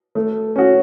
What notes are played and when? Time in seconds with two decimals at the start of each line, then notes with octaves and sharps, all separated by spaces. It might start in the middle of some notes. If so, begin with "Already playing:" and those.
0.15 A3
0.56 C#4 F#4